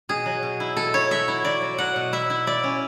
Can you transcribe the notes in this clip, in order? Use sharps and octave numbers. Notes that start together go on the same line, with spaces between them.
B2 G#4
F#3
B2
E4
B2 A4
E4 C#5
F#3 E5
E4
F#3 D5
F#3
F#3 F#5
B2
E4 E5
E4
E4 D5
C#4